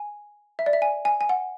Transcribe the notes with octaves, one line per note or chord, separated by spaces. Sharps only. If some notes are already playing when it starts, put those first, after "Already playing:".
Already playing: G#5
E5
D5
E5
G#5
G#5
G#5
F#5